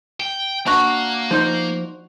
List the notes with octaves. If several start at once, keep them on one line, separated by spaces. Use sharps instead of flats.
G5
A#3 D4 F#4
F3 D#4 C5